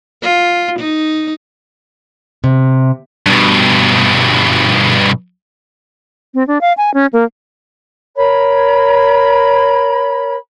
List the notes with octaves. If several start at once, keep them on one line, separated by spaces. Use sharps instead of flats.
F4
D#4
C3
G2 B2
C4
D4
F5
G#5
C#4
A#3
A#4 C#5 B5